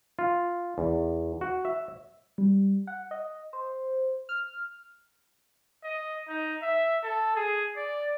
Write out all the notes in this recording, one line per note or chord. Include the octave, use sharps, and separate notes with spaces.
F4
E2
F#4
E5
G3
F#5
D#5
C5
F6
D#5
D#4
E5
A4
G#4
D5